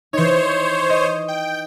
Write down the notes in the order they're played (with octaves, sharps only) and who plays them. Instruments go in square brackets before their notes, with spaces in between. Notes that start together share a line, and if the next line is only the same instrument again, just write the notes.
[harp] E3 D#4 [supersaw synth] C5 C#5
[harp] D#5
[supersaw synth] G5